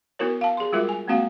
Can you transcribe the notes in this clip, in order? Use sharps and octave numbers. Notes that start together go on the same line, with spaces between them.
B3 E4 F#4 A#4 C#5
F5 A5
G#4 C6
G3 G#3 F4 F#4 A#4 E5
G#5
G#3 A#3 C4 F#4 F5 F#5